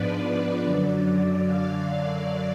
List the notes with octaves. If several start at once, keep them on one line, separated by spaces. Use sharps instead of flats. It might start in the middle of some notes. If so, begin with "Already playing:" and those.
Already playing: G#2 F3 B3 D4 B4 D5
F#2 D3 F#3
F5